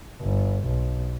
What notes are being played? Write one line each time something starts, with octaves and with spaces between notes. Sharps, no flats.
G1
B1